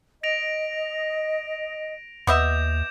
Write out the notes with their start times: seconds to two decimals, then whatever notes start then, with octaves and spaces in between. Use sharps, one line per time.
0.23 D#5 A#6 D7 F7
2.27 D#2 B3 D#5 E5 D6 G6 E7